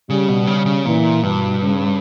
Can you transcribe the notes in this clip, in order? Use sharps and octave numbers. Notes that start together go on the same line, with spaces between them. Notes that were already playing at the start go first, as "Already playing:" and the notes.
C#3 G3
B2
C#3
C#3
A#2 E3
G2 B2
C#3